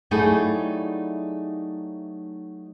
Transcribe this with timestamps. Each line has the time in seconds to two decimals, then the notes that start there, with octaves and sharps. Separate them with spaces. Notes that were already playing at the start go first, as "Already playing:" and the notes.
0.11 F#3 G3 A3 D#4 E4 G#4